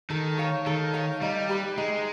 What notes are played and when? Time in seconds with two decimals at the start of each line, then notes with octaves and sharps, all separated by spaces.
0.10 D#3 A4
0.38 C#5 F5 A5
0.66 D#3 A4
0.94 C#5 F5 A5
1.22 G3 D#4
1.49 G4 B4 D5
1.78 G#3 D#4